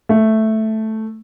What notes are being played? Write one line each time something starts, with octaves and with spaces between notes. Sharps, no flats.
A3